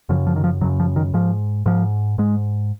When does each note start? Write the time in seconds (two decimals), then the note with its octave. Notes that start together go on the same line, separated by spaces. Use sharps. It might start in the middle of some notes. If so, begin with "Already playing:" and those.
0.09 F#2 C#3 F3
0.27 F3
0.36 D#3
0.44 F3
0.61 F#2 C#3 F#3
0.80 F3
0.96 D#3
1.14 G#2 F3
1.66 G#2 F3
2.18 G#2 G#3